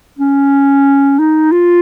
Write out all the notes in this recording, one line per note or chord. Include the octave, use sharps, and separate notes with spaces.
C#4
D#4
F4